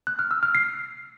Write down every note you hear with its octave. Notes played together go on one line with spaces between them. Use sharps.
F#6
F6
E6
F6
C7